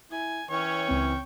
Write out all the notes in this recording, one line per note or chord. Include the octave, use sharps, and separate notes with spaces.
E4 G#5
E3 C#4 C#5 G5 C#6
C#2 C4